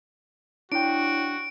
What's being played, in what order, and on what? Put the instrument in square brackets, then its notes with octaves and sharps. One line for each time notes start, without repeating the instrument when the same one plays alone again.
[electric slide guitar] D4 G5 [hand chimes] E4 C#5 [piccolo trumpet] F#4 [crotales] D7